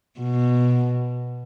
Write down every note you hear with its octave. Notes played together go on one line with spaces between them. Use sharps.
B2